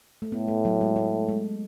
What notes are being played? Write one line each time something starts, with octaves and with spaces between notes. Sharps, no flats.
A3
A2 B3
A3
F#3
G#3
A3
G#3